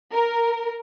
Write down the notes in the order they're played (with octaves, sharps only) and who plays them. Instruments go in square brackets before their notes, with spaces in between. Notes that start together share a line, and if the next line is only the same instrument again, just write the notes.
[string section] A#4